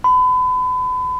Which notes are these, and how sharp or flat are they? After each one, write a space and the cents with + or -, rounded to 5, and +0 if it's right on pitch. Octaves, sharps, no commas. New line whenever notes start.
B5 +35